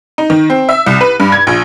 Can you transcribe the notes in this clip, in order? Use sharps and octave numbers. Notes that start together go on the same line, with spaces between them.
D#4
D#3
C4
E5
C2
B4
G2
G#6
A#1